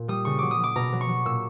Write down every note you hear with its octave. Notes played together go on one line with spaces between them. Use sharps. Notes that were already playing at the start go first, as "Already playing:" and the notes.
Already playing: A#2
G3 D#6
C#3 C#6
F#3 D6
D#6
F#3 D6
B2 A#5
F#3
C#6
F#3
A#2 E6